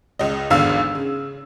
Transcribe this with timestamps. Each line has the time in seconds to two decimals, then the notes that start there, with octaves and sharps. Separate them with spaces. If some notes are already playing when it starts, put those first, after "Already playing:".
0.19 C#2 D#5
0.50 G#1 E2 D3 F5 E6
0.95 C#3